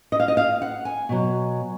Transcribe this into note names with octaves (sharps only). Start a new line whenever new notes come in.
D#5
F5
D#5
F5
F#5
G#5
B2 F#3